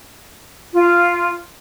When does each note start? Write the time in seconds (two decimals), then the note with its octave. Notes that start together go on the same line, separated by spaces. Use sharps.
0.73 F4